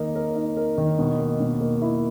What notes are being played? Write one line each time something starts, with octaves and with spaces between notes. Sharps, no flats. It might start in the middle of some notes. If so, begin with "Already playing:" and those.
Already playing: D#3 A#3 D#4 A#4
A#4
D#4
A#4
D#3
B2
A#3
B2
A#3
E4